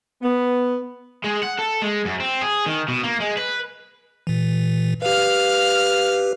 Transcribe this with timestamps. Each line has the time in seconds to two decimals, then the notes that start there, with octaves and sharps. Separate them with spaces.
0.22 B3
1.24 G#3
1.43 F#5
1.59 A4
1.82 G#3
2.05 F#2
2.20 C4
2.41 G#4
2.66 D#3
2.88 B2
3.03 A#3
3.20 G#3
3.37 B4
4.27 A#2 E3
5.02 G4 B4 F5 F6